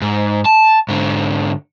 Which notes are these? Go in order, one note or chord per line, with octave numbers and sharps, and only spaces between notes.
G#2
A5
G#2 D3